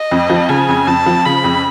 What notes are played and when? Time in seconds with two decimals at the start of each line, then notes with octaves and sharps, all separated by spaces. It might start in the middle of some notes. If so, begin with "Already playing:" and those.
Already playing: D#5
0.12 F2
0.30 F3
0.49 C#3 G#5
0.69 F2
0.87 F2 A5
1.06 F3
1.26 C#3 B5
1.44 F2